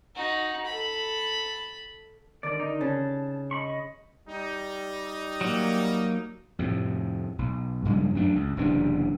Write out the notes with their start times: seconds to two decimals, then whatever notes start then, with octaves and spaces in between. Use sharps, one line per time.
0.15 D#4 F#4
0.66 A4 B5
2.43 D3 D#3 D5
2.60 D#4
2.81 C#3 A5
3.51 D#5 B5 C#6
4.28 G3 D#4
5.41 F#3 A#3
6.59 F2 A2 C3
7.39 B1
7.85 G2 C#3 F#3 G#3
8.15 F#2 F#3 A3 D4
8.36 C#2
8.57 F#1 C3 E3 D4